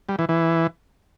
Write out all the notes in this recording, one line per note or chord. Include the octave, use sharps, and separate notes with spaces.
G3
E3
E3